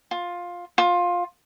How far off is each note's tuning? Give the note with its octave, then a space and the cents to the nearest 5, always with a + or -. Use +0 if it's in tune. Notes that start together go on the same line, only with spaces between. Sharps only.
F4 +10
F4 +15